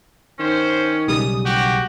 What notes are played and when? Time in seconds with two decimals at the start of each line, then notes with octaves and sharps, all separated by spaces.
0.39 D#3 C#4 C5
1.08 B1 C#3 G3 D#6
1.45 A1 F#4 G4